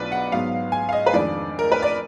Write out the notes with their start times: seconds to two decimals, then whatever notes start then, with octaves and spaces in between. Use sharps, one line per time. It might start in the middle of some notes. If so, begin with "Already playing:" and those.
Already playing: B1 B2 F#3 D4 F4 B4 D5
0.12 F#5
0.32 G#2 F#3 B3 F5
0.72 G#5
0.89 F5
0.93 D#5
1.06 B4
1.13 F2 D#3 G#3 D4 D5
1.59 A#4
1.72 B4
1.82 D5